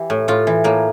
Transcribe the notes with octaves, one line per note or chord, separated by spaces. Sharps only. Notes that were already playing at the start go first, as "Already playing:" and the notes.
Already playing: E3 G4
A2
A2 F4
E3
A2 A#3